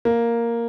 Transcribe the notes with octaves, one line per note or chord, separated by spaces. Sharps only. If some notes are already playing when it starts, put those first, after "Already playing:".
A#3